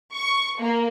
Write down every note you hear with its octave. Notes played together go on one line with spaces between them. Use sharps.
C#6
A#3